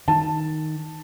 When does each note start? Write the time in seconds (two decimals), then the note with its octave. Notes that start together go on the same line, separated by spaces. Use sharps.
0.08 D#3 A5